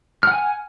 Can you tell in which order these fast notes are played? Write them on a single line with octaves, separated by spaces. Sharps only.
F6 F#5 G#5